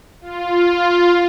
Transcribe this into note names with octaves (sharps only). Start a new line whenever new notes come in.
F4